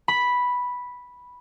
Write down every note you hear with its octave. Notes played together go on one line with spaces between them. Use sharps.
B5